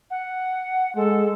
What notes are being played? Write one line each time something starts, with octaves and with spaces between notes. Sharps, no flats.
F#5
G#3 A4